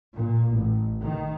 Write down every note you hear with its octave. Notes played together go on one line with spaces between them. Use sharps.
A#2
A1
D#3